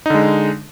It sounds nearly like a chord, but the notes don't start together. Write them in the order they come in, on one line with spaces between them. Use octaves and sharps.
D#4 D3 G#3